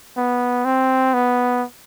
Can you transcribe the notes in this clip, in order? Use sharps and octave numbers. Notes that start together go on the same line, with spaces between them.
B3
C4
B3